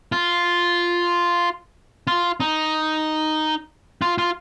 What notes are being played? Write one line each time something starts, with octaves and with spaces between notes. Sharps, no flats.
F4
F4
D#4
F4
F4